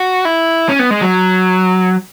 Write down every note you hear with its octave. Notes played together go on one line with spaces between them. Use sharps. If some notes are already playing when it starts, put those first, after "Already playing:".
Already playing: F#4
E4
C#4
B3
G#3
F#3